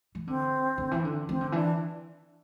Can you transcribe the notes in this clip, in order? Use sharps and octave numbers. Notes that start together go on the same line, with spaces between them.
E3
D3 C4
D3
E3
D3
E3 C4
D3
E3 D4